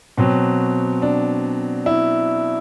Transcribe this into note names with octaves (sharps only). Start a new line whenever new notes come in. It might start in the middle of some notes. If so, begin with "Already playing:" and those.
B2 F#3 C4
D4
E4